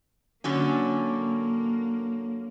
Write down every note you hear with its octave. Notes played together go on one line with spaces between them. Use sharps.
D3 F#3 A#3 C#4